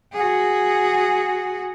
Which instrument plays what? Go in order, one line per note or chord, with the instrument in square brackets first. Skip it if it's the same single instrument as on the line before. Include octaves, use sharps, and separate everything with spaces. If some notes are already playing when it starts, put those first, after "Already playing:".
[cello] F#4 G#4